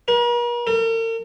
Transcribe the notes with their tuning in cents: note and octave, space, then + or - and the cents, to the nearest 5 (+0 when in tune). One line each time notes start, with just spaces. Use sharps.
A#4 +45
A#4 -45